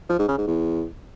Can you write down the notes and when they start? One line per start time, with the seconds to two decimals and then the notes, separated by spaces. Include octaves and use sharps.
0.10 F3
0.19 G#2
0.28 C#3
0.38 G#2
0.47 E2